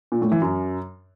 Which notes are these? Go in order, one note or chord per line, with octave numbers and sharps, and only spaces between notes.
A#2
A2
E3
F#2